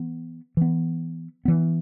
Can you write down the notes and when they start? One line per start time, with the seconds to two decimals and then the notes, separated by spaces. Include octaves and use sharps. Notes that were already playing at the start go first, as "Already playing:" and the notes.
Already playing: E3 B3
0.57 E3 B3
1.45 E3 B3